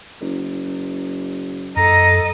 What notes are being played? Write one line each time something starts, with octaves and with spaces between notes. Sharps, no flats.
F#1
F#2 A4 D#5 A#5